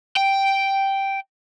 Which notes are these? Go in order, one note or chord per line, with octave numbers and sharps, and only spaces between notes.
G5